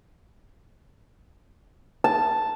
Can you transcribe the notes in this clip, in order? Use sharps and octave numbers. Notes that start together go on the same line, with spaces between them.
A5